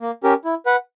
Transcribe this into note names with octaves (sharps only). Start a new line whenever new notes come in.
A#3
C#4 G4 A#4
E4
B4 F#5